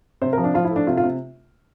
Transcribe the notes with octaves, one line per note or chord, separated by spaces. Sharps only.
C3 C5
A#4
F3
D4
F3 F4
E4
A3
D4
C3 F4
F4
C3